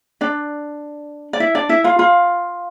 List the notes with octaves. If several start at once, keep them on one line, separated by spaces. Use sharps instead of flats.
D4 D5
D5
E4 E5
D4 D5
E4 E5
F4 F5
F4 F5